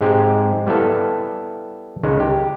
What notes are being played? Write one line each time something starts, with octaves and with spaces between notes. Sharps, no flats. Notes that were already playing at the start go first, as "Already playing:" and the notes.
G#2 G#3 C4 G4
G3 B3 E4 A4 F5
C#2 D#3 G#3
G4